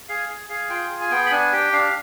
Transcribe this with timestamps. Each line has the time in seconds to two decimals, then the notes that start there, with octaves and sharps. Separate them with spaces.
0.09 G#4 F5
0.29 G#4
0.49 G#4 F5
0.70 F4 G5
0.90 G#4
1.01 G#5
1.11 B3 G5
1.26 B5
1.31 D4 G#5
1.52 G4 G5
1.73 D4 F5